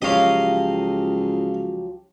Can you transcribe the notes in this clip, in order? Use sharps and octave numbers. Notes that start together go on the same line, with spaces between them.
C#2 F3 F#3 G4 D#5 F5